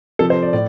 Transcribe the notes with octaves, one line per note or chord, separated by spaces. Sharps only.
C3 F3 A4
C5
D5
A2 D5